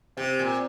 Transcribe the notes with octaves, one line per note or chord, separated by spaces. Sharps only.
C3 C4
A#2